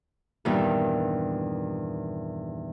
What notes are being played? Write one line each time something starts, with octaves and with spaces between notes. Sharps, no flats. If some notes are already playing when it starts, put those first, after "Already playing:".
E2 G2 A#2 D#3